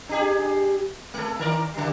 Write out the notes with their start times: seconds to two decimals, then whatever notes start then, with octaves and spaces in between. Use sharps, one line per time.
0.09 D4 G4 G#4
1.14 G#3 A4
1.39 D#3 A#4 D5
1.74 C#3 G3